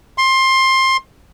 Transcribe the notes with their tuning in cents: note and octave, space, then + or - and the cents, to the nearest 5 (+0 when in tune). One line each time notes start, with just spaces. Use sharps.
C6 +20